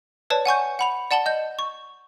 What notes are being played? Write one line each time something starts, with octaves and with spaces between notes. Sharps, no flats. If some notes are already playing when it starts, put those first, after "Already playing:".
B4 C#5 D5 A5
F#5 G#5 C#6 G6
F#5 B5 F7
D5 F#5 A5 F#7 G7
D#5 G6
C#6